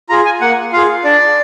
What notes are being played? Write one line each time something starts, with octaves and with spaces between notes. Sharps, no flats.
F4 G#4 A#5
G#5
A#3 F#5
F4 G#4 F5
D4 D5